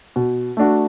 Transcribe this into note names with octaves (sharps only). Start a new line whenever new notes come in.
B2
A3 D4 F#4